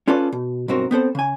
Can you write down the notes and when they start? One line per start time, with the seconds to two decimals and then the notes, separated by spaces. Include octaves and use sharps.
0.07 C#4 F4 A4 B4 D5
0.32 B2
0.68 B1 G2 C4 F#4 A#4
0.91 B3 C4 A4 C5
1.15 C#3 G#5